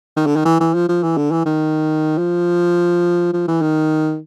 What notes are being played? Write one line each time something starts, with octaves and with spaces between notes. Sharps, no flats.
D#3
D3
D#3
E3
E3
F3
F3
E3
D3
E3
D#3
F3
F3
E3
D#3